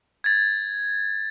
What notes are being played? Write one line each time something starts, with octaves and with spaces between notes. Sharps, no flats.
G#6 A6